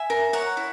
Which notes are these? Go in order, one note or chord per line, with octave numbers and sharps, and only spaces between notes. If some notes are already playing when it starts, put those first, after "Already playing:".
Already playing: E5 G#5
A#4
C#5 F#5 A#5
E4